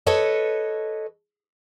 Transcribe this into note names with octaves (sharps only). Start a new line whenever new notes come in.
A4 B4 C#5 D#5 A5